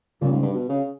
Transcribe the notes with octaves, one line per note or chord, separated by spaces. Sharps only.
A#2 C#3 G3 C#4
G#2
G2
B2
C#3